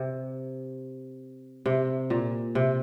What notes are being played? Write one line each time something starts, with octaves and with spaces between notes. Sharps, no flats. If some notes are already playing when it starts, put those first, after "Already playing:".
Already playing: C3
C3
A#2
C3